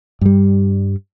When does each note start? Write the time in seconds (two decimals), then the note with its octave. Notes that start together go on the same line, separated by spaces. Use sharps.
0.21 G2 G3